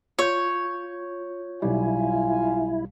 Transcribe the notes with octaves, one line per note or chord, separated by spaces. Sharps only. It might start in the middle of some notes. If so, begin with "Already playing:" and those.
F4 C#5 G6
B1 G3 E4 F4 F5 G#5